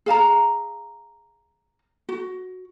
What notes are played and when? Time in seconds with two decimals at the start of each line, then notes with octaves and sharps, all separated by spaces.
0.06 G#4 F5 A5 A#5
2.09 F#4